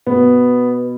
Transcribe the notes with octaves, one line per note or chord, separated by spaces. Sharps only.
B2 B3